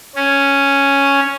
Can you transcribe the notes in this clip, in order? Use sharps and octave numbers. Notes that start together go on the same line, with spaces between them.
C#4